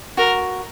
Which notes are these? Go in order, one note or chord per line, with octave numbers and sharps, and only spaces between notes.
F#4 A#4